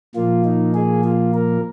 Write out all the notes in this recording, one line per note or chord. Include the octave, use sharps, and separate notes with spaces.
A#2 F3 A#3 F4
D#4
G#4
F4
A#4